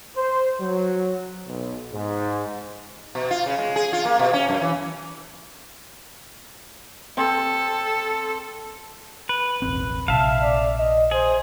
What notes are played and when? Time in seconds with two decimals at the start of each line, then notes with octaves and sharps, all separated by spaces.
0.17 C5
0.61 F#3
1.48 B1
1.93 G#2
3.15 B2
3.31 F4
3.46 C#3
3.58 G#3
3.76 G#4
3.93 F4
4.05 A#3
4.19 B2
4.33 C#4
4.49 F#2
4.62 E3
7.17 C4 A4
9.29 B4
9.62 E1 A1 C4
10.08 A#1 C3 E5 F5 A5
10.42 D5
10.79 D#5
11.11 G#4 C5